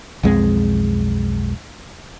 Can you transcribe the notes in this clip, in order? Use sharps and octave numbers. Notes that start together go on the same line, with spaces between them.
B1 F2 G#3 C4